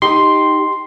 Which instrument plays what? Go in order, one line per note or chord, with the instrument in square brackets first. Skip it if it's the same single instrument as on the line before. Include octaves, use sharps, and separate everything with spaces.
[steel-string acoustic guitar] D#4 G4 G5 [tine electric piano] C6